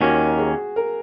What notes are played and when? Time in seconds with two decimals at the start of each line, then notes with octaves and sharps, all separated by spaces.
0.01 D#2 D#3 A#3 C#4 F#4
0.39 G#4
0.76 A#4